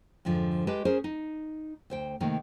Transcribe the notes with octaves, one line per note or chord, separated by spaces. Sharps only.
F2 G#2 D3 F3
G#3 G4 B4 A5
C#4 G#4 A#4 C5
D#4
D2 C5 G5
C3 D#3 A3 A#3